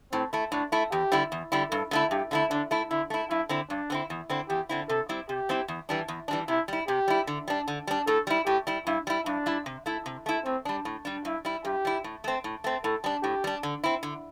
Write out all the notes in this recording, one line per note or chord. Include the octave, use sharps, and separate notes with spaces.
A2 C4
A3 E4
A2 D4
A3 E4
E2 G4
D3 G3 E4
E2
D3 G3 E4
G2 A4
D3 A3 E4
G2 G4
D3 A3 E4
D3 D4
A3 E4
D3 E4
A3 E4
G2 E4
D3 C4 E4
G2 D4
D3 C4 E4
E2
D3 C4 E4
E2 G4
D3 C4 E4
C3 A4
G3 C4 E4
C3 G4
G3 C4 E4
E2
E3 G3 D4
E2
E3 G3 D4
C3 E4
G3 E4
C3 G4
G3 E4
D3
G3 D4
D3
G3 D4
A2 A4
G3 E4
A2 G4
G3 E4
G2 E4
G3 E4
G2 D4
G3 E4
C3
A3 E4
C3
A3 E4
A2 C4
G3 D4
A2
G3 D4
G2 E4
G3 E4
G2 G4
G3 E4
A2
A3 C4
A2
A3 C4
A2 A4
G3 D4
A2 G4
G3 D4
D3
C4 E4
D3